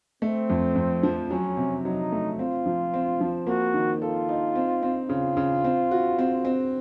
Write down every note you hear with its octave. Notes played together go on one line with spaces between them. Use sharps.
A3 C4
F2
F2
F3
F#3 C#4
C3
F#3 D#4
A3
C4 F4
F3
C4
F3
A#3 F#4
D#3
F4 A4
D#4
C4
C4
C#3 F4
C#3
C4
F#4
C4
C4